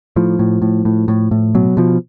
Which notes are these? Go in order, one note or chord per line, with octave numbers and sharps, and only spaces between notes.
A2 F3
A2
A2
A2
A2
A2
B2 F#3
B2 F3